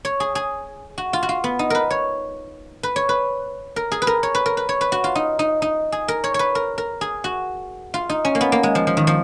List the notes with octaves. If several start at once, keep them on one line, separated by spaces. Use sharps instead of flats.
C#5
G#4
G#4
F#4
F4
F#4
F4
B3
D#4
A#4 B4
C#5
B4
C#5
B4
A#4
G#4
B4
A#4
C#5
B4
A#4
B4
C#5
B4
F#4
F4
D#4
D#4
D#4
G#4
A#4
C#5
B4 C#5
A#4
A#4
G#4
F#4
F4
D#4
C#4
A#3
B3
A#3
G#3
F3
F3
D#3
F3